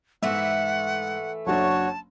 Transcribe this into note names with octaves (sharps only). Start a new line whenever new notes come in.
G#2 E3 A3 E5 F#5
F#1 F#3 D4 F#4 C#5 A5